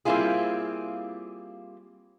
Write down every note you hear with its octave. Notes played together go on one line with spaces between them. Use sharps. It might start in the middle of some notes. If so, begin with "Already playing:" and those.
G3 A#3 C4 E4 F4 G#4